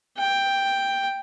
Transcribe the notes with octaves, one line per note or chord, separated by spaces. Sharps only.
G5